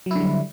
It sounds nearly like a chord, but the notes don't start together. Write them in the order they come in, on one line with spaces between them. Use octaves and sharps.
F#3 E4 D3 G3